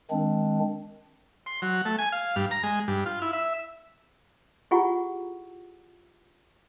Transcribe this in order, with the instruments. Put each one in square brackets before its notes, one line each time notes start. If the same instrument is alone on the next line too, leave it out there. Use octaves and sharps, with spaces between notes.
[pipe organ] D#3 G#3 C4 D4
[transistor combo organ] C6
F#3
A3
G#5
F5
G2
A#5
G#3
G2
F4
E4
E5
[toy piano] E4 F4 G4 G#4 F#5 C#6